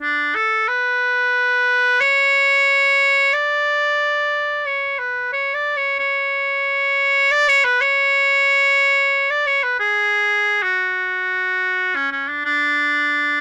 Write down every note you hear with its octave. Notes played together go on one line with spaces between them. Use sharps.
D4
A4
B4
C#5
D5
C#5
B4
C#5
D5
C#5
C#5
D5
C#5
B4
C#5
D5
C#5
B4
G#4
F#4
C#4
C#4
D4
D4